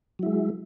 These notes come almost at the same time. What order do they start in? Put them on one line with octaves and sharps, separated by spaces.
F#3 E4 G#3